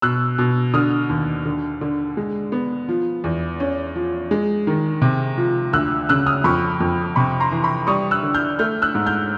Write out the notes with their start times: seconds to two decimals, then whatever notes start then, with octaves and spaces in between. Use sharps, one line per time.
0.02 B2 E6 F#6
0.38 B2
0.74 D3 D#6 F6
1.10 D#2
1.46 D3
1.81 D3
2.17 G#3
2.52 B3
2.89 F3
3.24 E2
3.60 C#4
3.96 F3
4.31 G#3
4.67 D#3
5.02 C3
5.38 F3
5.73 D2 E6 F#6
6.09 C#3 E6 F#6
6.26 D#6 F6
6.44 F2 B5 C#6
6.80 F2
7.16 C3 B5 C#6
7.40 A#5 C6
7.52 E3
7.63 B5 C#6
7.87 G3 C#6 D#6
8.11 E6 F#6
8.23 D3
8.34 F6 G6
8.59 A3 F6 G6
8.82 E6 F#6
8.95 G#2
9.06 F6 G6